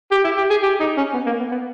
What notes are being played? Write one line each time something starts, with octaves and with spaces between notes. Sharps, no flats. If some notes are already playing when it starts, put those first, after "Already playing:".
G4
E4
G4
G#4
G4
D#4
C#4
B3
A#3
B3
B3